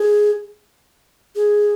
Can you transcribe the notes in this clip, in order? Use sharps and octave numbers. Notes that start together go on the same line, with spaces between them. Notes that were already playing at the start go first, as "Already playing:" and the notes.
Already playing: G#4
G#4